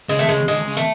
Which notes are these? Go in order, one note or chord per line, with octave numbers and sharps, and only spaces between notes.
C#3 G#3
A3
C#3 G#3
D3 G#3
C#3
A3